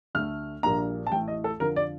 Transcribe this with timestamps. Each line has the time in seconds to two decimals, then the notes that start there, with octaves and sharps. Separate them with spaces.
0.15 D2 D3 A3 F6
0.63 A#1 A#2 G3 A#3 D4 A#5
1.07 A5
1.12 A1 A2 A3 G5
1.28 D#5
1.44 A4
1.60 F2 D3 F3 A#4
1.76 D5